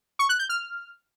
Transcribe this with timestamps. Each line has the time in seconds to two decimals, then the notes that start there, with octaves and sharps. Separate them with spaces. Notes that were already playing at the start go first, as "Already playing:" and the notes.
0.19 C#6
0.29 F#6
0.39 G6
0.49 F6